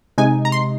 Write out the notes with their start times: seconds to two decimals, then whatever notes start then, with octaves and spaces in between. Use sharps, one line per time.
0.18 C3 G#3 D#4 G#5
0.45 A#5
0.52 C6